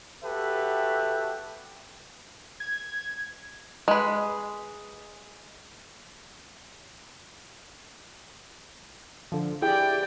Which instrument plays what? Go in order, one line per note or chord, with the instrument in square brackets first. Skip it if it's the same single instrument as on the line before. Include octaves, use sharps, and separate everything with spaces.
[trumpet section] F#4 G4 A4 B4 E5
[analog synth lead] G#6
[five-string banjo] G#3 B4
[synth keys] D3 F3
[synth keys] E4 G4 G#4 [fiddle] D5 G5